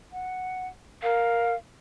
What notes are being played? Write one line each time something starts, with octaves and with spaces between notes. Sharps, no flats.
F#5
A#4 F5